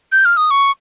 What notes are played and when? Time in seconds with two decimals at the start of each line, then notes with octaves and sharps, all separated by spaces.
0.12 G6
0.25 F6
0.37 D#6
0.51 C#6